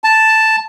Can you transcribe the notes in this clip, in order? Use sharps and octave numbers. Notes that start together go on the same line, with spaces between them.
A5